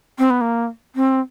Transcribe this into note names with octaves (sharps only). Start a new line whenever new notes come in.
C4
B3
A#3
C4